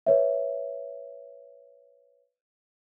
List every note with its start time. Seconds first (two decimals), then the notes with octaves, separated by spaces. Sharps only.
0.07 B4 C#5 E5